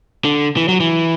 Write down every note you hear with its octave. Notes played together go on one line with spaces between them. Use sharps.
D3
E3
F#3
E3